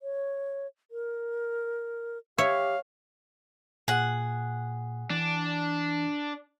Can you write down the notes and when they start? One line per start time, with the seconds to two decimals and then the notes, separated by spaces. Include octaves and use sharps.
0.02 C#5
0.91 A#4
2.38 G4 C#5 E5 F5
3.88 A#2 G#4 F#5
5.10 E3 D4